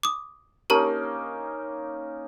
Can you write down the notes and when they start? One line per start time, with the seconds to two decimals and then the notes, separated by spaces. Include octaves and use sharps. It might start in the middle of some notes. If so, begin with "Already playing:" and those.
0.03 D6 D#6
0.70 A#3 C#4 D#4 G4 A#4 A5